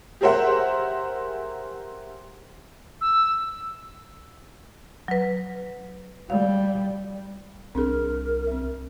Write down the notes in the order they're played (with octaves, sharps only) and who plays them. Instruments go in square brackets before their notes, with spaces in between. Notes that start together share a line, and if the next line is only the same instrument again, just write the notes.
[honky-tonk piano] G4 G#4 A#4 C5 E5 F#5
[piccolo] E6
[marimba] F#3 B4
[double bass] G3 [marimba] F5
[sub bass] C2 [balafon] C4 D4 G#4 [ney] A#4
[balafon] C4 E5